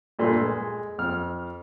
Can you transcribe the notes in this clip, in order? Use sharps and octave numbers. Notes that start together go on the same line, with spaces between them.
G2 A#2 A3 A4 C6
G#3
F2 F6